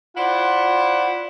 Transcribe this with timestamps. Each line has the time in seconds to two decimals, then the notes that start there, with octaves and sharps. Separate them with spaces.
0.16 E4 F4 C5 D5 F#5